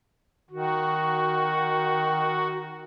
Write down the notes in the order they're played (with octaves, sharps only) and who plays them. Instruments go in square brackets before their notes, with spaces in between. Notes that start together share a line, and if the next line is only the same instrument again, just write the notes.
[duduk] D#3 [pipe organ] F#4